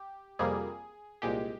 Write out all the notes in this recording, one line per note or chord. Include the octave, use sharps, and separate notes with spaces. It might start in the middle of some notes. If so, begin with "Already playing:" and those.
Already playing: G4
F2 C3 G3 A#3 G#4
C2 A#2 G#3 G4